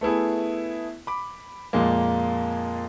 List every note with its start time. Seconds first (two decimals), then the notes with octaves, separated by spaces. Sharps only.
0.01 A3 B3 E4 G#4
1.07 B5 D6
1.73 F2 A#2 G#3 A#3